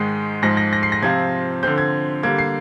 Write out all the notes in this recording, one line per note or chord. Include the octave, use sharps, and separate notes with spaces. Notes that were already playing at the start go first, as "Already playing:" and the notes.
Already playing: G#2 D#3 G#3 D#4
G#2 F3 G#3 A#6
A#6
A#6
C7
A#6
C3 F3 C4 F4 G#6
D3 F3 C4 G6
G#6
D3 G3 A#3 G#6
C7